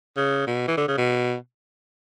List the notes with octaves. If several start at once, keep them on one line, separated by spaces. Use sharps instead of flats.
C#3
B2
E3
D3
C#3
B2